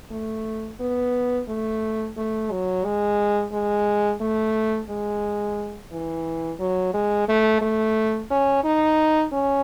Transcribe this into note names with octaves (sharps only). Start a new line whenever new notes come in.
A3
B3
A3
A3
F#3
G#3
G#3
A3
G#3
E3
F#3
G#3
A3
A3
C#4
D#4
C#4